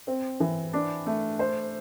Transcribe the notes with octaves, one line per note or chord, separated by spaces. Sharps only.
C4
E3
D4
A3
C5